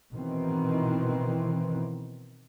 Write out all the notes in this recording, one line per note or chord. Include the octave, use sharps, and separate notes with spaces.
B2 D#3 E3 C4